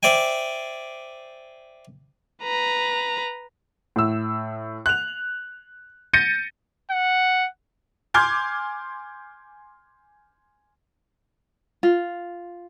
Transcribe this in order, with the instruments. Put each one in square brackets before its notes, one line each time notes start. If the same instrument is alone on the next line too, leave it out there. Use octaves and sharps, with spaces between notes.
[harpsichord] C5 D5 E5 G5 G#5
[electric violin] B4 A#5
[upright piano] A2 E6
F#6 F7
G6 A6 A#6 C#7 D#7
[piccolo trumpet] F#5
[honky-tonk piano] G#5 C6 D6 F6 G6 G#6
[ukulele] F4